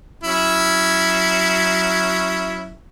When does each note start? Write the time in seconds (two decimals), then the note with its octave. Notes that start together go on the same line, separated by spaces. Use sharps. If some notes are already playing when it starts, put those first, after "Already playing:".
0.24 F#3 C#4 E4